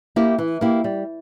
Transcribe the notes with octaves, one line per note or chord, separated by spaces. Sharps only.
A#3 E4 G4
E3
A#3 E4 G4
G3